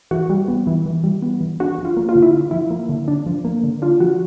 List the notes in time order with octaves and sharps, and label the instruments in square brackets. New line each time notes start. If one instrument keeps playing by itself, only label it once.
[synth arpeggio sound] E3 F#4
G3
B3
E3
E3
G3
B3
E3
D4 F#4
F3
F4
A#3
F4
D3
E4
D4
F3 E4
A#3
D3
D4
F3
A#3
D3
D4 F4
F3 F#4